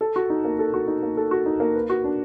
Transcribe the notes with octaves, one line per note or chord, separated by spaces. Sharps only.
A4
F#4
D#4
A#3
A4
F#4
D#4
A#3
A4
F#4
D#4
A#3
B4
F#4
D4